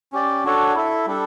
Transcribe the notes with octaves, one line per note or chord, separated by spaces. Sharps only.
C#4 G4 D5
D4 F#4 A4 C#5
E4 A4 E5
G3 D4 A4